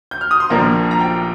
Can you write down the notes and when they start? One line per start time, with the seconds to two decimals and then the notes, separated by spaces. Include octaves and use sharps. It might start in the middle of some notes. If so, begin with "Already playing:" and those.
0.11 G6
0.21 F6
0.31 D#6
0.40 C6
0.50 A#1 A#2 F3 A#3 A#5
0.91 A#5
1.00 G5